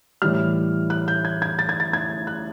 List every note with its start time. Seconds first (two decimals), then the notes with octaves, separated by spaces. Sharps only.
0.22 A2 E3 G3 F6
0.90 F#6
1.08 G6
1.25 G#6
1.42 G#6
1.59 A6
1.69 G#6
1.80 A6
1.93 G#6
2.27 F#6